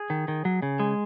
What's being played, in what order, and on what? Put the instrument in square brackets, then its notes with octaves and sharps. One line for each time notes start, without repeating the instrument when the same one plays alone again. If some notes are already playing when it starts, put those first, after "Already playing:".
Already playing: [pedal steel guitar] G#4
D#3
D#3
F#3
C#3
G#3